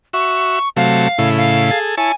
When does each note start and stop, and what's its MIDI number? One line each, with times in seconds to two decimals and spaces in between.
0.13 0.59 66
0.13 0.59 76
0.13 0.69 85
0.77 1.08 48
0.77 1.08 54
0.77 1.08 57
0.77 1.30 77
1.18 1.71 45
1.18 1.71 49
1.18 1.71 64
1.37 1.78 77
1.71 1.95 68
1.71 1.95 69
1.97 2.12 64
1.97 2.12 73
1.97 2.14 80
1.97 2.12 81